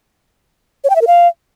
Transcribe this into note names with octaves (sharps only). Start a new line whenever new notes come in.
C#5
G5
E5
A#4
F5